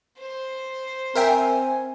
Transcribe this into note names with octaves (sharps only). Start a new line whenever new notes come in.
C5
C4 A#4 E5 G5 G#5